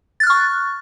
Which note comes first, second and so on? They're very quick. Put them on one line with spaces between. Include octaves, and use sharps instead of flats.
A6 F#6 F6 C#6